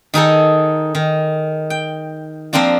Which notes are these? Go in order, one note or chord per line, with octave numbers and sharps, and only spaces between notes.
D#3 D#4 G#4 A4
D#3
G5
F3 A#3 C4 D4 F4